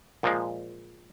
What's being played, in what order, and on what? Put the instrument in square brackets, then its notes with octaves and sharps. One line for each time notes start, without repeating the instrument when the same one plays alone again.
[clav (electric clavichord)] A#2 F3 G#3